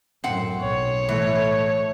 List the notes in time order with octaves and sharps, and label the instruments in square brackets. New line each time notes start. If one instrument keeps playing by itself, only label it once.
[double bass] F#2 A2 [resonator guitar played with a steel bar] C4 F#5
[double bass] B1 [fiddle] C#5
[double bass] A2 A3 [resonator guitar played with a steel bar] E3